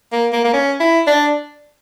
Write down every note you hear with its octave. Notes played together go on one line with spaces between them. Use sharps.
A#3
A#3
A#3
C#4
E4
D4